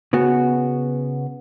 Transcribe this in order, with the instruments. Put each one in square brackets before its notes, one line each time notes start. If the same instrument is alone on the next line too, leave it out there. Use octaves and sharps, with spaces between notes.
[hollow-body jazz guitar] C#3 B3 F#4